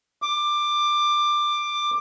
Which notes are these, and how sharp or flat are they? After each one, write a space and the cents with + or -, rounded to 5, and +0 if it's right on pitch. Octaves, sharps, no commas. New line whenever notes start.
D6 +15